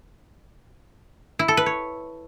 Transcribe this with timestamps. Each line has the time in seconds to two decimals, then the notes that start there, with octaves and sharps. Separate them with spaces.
1.39 E4
1.48 A4
1.57 B4
1.66 C#5